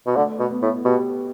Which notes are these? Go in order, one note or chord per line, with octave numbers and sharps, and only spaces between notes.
B2
D3 A3
B2
B3
A2
B2 G4